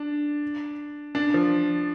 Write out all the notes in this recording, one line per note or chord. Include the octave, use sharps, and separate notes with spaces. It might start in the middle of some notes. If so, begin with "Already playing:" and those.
Already playing: D4
D4
F3